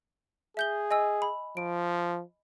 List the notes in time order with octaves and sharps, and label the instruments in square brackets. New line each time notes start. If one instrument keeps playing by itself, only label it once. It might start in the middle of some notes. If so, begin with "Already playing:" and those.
[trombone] G#4 [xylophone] E5 G6 G7
[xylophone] D#5 G#5 E6
B5
[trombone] F3 [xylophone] D7